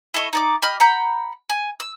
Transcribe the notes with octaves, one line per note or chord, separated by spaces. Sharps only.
E4 A4 D#5 C#6
D#4 D5 D6
G4 D#5 B5 F6
F#5 A#5 B5 G6
G#5
E6